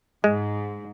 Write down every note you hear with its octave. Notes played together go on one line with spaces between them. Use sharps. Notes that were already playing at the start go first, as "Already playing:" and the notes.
G#2 G#3